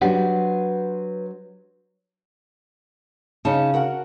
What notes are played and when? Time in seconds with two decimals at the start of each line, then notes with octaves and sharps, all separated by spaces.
0.02 F#3 D4 G4 B4 C5 F#5
3.45 C#3 C#4 D#4 C#5 A5
3.74 F#4 A#4 F#5